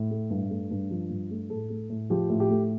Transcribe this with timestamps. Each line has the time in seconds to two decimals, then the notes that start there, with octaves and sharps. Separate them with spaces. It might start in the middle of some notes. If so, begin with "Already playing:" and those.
Already playing: A2
0.11 A3
0.30 G2
0.50 A3
0.71 G2
0.91 F3
1.10 G2
1.31 A3
1.50 A2 A4
1.70 A3
1.90 A2
2.10 F3 G4
2.29 A2
2.40 G4
2.50 A3